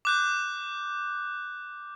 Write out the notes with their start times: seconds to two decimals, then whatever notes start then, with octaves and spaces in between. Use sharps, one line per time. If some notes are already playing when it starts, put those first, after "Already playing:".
0.05 D6 F#6 G6